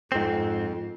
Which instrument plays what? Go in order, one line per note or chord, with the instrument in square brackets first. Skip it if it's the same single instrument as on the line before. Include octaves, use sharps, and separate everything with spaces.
[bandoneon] F2 [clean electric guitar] G#2 C4